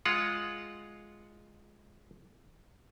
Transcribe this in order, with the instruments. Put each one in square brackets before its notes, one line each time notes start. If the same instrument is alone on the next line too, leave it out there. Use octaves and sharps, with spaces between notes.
[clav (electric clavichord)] G#3 F4 F#5